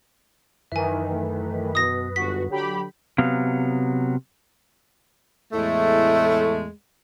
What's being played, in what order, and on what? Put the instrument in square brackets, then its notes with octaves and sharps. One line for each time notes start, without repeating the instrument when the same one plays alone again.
[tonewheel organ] F#2 B4 [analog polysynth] D#3 E3 [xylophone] E5 G#5
[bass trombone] A3
[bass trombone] B2 [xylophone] D#6 A#6
[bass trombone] G1 [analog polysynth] F#4 [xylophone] B6
[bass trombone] D3 [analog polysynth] F#3 G4 B5
[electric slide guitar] C3 F#3 B3 F5
[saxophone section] E2 A2 G#3 A3